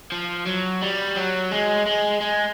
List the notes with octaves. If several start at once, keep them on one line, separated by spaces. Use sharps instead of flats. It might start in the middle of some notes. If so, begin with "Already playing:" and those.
F3
F#3
G3
F#3
G#3
G#3
G#3